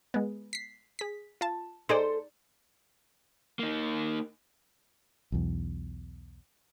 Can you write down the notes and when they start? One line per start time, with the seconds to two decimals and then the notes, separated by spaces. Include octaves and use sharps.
0.14 G#3 B3
0.53 B6 C7
0.99 G#4 B6
1.41 F4 A5
1.89 D#4 G#4 A4 C5 D5
3.59 A#3 D#4
5.32 B1 E2